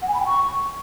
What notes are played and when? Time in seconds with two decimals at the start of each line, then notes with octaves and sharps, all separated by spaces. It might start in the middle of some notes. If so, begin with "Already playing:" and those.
0.02 F#5
0.08 G#5
0.14 B5
0.20 G5
0.26 C#6